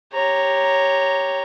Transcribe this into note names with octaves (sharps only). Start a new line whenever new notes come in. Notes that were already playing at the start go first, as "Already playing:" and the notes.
G4 C#5 A#5